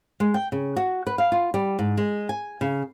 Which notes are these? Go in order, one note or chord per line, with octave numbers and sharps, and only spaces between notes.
G#3
G5
C#3
F#4
B4
F5
F4
G3
G#2
G#3
G#5
C#3